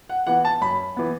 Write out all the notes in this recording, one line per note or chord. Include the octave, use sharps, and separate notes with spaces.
F#5
E3 B3 F#5
A5
F#2 B5
E3 B3